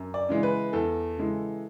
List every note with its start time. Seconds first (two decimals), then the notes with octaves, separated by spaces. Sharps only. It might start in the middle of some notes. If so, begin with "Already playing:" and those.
Already playing: F#2
0.14 D5
0.29 C#3 E3 G#3
0.43 B4
0.73 E2 A4
1.18 C#3 E3 G#3